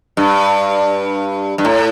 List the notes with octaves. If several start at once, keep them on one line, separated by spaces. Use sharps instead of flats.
G2
G2
A2